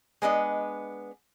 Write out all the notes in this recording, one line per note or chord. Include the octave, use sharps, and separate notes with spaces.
G#3 B3 D4 D#5